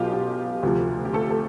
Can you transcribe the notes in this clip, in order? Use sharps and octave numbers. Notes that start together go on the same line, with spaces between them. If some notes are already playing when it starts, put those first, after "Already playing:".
Already playing: B1 B2 F4 G4
G4
D2 C3 F3
G4
A3 A4
A4